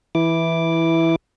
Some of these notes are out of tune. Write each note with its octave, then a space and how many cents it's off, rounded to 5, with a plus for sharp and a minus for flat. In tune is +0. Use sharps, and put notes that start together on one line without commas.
E3 +0 E4 -5 D6 +0